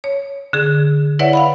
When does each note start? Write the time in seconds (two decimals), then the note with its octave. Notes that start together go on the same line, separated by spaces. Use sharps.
0.04 C#5
0.53 D3 G#4
1.19 E4 B4 C#5 D5 E5 F#5
1.33 F5 F#5 B5